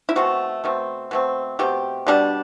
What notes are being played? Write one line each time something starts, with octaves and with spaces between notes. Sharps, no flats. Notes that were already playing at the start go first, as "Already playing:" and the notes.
E4
B2 A3 C4 F#4
B2 A3 C4
B2 A3 C4
B2 A3 C4 G4
B2 G3 D4